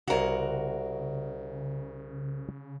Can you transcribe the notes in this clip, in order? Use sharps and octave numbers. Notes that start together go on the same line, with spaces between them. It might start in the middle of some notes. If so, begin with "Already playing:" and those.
C2 C#3 F#4 A#4 C#5 F5